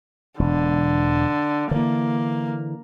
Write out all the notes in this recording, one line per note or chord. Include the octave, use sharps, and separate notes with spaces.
E1 D3
D3 E3 A#3